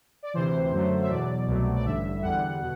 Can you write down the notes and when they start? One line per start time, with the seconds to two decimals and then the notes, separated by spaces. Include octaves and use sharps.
0.23 D5
0.34 D2 C3 E3 C5
0.72 F#2 D3 F#3 A3
1.02 E5
1.10 E2 B2 F#3 D5
1.47 C2 B2 F#3 A3
1.76 D5
1.85 A1 G2 D3 E5
2.22 E2 D3 G3 F#5
2.60 B2